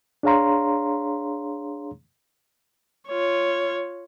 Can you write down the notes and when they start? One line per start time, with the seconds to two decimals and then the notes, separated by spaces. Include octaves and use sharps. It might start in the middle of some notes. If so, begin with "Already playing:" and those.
0.23 D4 G#4 C#5 F5 A#5 C6
3.08 F4 C#5